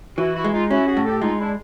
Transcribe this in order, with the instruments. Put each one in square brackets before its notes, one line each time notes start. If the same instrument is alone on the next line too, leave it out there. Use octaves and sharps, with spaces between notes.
[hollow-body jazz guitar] E3 [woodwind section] E4 F#4
[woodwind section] E4 F#4
[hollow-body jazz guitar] G#3
[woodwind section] D#4 F4
[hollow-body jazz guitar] C#4 [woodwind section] E4 F#4
[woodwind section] F#4 G#4
[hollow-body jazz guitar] A2
[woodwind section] G4 A4
[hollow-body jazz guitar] G#3 [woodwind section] D#4 F4
[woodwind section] D4 E4